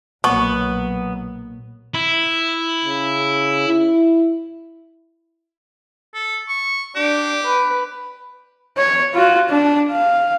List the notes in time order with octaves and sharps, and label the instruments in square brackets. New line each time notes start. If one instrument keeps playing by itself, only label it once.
[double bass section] B1 F#3 [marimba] A#2 A#3 C#5 [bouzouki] B3 [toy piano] C#6
[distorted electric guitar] E4
[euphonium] C#3
E4
[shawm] A4
C#6
[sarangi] D4 [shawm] G4
[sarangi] B4
[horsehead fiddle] C#5
F4 F#4
D4
F5